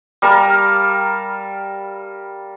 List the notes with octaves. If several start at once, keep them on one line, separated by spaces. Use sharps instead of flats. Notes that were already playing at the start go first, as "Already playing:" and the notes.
G3 A#4 F5 A5